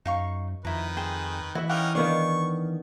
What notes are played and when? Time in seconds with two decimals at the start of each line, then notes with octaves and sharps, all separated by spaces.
0.06 F#2 D#4 F5 C#6
0.65 F2 D#3 E4 B4 A#5
0.97 G#4 C5 G5
1.55 E3 E4 F#4 E5
1.69 C#4 D#4 F4 G4 A#4 F#5
1.95 D#3 B3 D4 F5 C#6